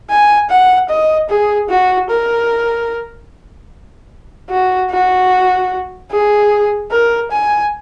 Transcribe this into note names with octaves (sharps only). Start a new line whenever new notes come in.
G#5
F#5
D#5
G#4
F#4
A#4
F#4
F#4
G#4
A#4
G#5